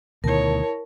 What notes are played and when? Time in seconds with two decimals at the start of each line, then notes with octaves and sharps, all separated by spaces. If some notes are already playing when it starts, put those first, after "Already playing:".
0.24 D2 B2 D#3 E4 A#4 C#5 A5